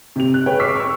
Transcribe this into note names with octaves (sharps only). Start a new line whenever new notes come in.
C3 G4 F7
F#6
G#4 B4 C#5 G5
C#6 D6 E6 F6 B6 C7
C#6 E6